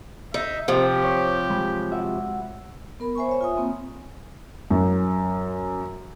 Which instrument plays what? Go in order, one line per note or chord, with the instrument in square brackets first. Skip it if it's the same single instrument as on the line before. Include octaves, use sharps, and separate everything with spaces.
[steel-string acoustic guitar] D#4 [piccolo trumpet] E5
[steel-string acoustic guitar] C3 F3 [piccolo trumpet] G4
[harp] C#5
G#3 B5
F#4 E5 F#5
[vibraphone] B3 A#4 B5
C5 E5 G#5 B5 C#6
C#5 E5
F4 G#5 D#6
A#3 C4
[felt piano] F#2